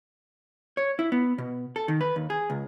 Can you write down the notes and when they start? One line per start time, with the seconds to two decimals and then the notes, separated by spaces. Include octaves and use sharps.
0.77 C#5
0.99 E4
1.12 B3
1.38 B2
1.76 A4
1.88 D#3
2.01 B4
2.16 D#2
2.30 G#4
2.50 C#2